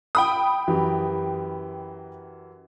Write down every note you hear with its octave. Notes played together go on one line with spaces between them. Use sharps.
G5 B5 D#6
F#2 E3 G4